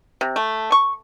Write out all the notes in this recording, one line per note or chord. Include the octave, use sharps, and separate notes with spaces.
C3
A3
C#6